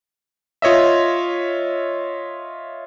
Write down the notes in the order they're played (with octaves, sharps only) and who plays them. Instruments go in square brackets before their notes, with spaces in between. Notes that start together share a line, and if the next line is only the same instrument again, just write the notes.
[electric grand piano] F4 C#5 D#5 E5